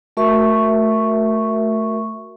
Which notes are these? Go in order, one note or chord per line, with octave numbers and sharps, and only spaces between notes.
A3 F#4 A#4 E5 C#6